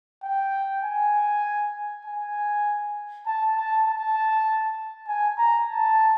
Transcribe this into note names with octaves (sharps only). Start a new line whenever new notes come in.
G5
G#5
G#5
A5
A5
A5
G#5
A#5
A5